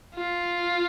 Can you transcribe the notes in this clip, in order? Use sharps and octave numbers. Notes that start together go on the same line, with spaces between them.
F4